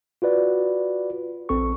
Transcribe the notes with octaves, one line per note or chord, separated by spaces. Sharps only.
F4 F#4 B4 D5
A#1 C4 A4 C#6